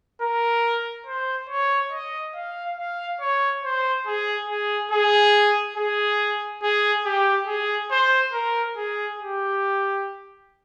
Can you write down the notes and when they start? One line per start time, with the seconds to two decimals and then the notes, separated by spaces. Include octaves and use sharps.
0.21 A#4
1.06 C5
1.49 C#5
1.92 D#5
2.35 F5
2.77 F5
3.20 C#5
3.64 C5
4.06 G#4
4.49 G#4
4.92 G#4
5.76 G#4
6.62 G#4
7.05 G4
7.47 G#4
7.90 C5
8.33 A#4
8.76 G#4
9.19 G4